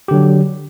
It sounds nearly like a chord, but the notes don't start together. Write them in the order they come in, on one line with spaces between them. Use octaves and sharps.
G4 D3 F#3